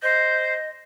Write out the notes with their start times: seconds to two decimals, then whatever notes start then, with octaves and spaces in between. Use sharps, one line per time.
0.02 C5 D#5 G6